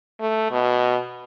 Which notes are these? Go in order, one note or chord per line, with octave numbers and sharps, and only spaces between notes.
A3
B2